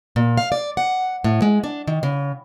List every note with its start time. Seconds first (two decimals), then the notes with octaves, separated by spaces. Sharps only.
0.16 A#2
0.38 F5
0.52 D5
0.77 F#5
1.24 A2
1.42 G#3
1.64 D4
1.87 D#3
2.03 C#3